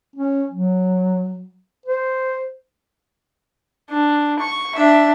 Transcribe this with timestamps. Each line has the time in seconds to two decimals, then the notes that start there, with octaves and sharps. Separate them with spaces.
0.16 C#4
0.51 F#3
1.86 C5
3.90 D4
4.39 C#6
4.75 D4 E5